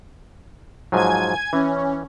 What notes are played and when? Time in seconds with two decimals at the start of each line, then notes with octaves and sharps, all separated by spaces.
0.92 G#2 F3 F#3 G#5 G#6
1.53 E3 C#4